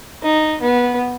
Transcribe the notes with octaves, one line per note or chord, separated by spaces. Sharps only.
D#4
B3